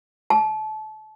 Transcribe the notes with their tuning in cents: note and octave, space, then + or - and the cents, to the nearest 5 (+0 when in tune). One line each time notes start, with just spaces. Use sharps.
A5 -30